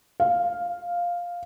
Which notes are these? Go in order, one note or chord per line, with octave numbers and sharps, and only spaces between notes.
F5